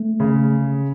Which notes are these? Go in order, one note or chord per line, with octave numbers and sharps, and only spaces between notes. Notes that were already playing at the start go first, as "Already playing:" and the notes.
Already playing: A3
C#3